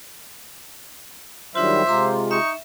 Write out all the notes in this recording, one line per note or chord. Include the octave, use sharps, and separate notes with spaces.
D#3 F#3 G3 D4 F4 C5 E5
C3 G#3 F4 A#5 C6 D6
D#4 E5 C#6